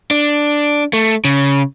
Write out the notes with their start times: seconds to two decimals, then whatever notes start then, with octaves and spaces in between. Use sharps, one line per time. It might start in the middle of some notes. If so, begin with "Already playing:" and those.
0.11 D4
0.93 A3
1.25 C#3